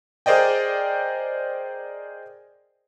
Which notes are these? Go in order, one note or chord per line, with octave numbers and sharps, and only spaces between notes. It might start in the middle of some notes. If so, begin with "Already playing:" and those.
G#4 A#4 C5 D5 D#5 G5